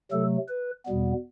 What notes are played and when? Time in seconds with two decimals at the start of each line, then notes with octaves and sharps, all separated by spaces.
0.11 C3 F#3 A3 A4
0.49 B4
0.86 E2 B2 G3 B3